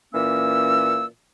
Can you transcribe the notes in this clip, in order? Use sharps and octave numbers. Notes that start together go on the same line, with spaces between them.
A#2 E3 A#3 C#4 E6